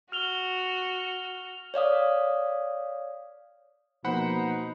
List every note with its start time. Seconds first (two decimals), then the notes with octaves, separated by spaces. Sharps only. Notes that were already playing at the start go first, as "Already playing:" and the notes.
0.12 F#4 F6 F7 G7
1.74 C#5 D5 F5 D#6
4.04 B2 F3 A#3 D#4 C5 F#5 B5